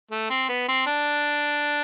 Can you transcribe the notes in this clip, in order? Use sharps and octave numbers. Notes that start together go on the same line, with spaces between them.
A3
C4
B3
C4
D4